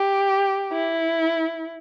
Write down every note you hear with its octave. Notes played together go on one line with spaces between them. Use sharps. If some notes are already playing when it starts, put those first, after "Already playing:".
Already playing: G4
E4